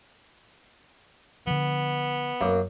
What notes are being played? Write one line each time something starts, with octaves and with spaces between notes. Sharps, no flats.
D3 F3 B3
F#2 A#3